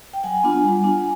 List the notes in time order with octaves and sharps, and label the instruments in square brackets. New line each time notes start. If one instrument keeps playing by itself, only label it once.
[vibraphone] G5
F#3 F#5 G#5
B3 D4 F4
G3
B3 D4 F4